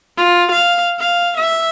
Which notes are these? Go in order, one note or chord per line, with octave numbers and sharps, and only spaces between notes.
F4
F5
F5
E5